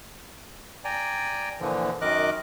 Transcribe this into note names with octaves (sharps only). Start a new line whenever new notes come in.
D5 G5 G#5 A#5
A#2 D3 E3 F3
F#2 D#3 A#4 D#5 D6 F#6